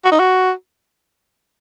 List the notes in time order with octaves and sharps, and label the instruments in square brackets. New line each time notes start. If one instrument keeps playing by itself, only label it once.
[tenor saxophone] F#4
D#4
F#4